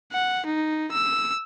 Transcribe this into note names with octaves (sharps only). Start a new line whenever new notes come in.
F#5
D#4
E6